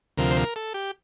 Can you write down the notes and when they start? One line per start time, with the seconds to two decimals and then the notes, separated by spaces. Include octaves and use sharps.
0.17 D2 C3 F3 A#4
0.31 C5
0.37 A#4
0.56 A4
0.74 G4